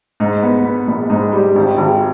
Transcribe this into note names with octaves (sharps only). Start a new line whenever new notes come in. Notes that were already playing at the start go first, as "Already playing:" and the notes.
G#2
B3
B3
A#1
G#2
G3
G#1
G#1